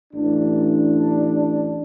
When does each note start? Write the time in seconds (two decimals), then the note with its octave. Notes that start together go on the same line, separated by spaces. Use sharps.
0.14 A1 D4